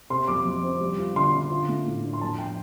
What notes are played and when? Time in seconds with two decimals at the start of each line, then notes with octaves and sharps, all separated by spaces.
0.10 C3 C6
0.27 F2 D6
0.45 F2
0.63 C4
0.80 G3
0.98 F4
1.15 D3 C6
1.34 D3
1.51 F4
1.69 A3
1.86 A2
2.04 D4
2.13 C6
2.21 F2 A5
2.38 G5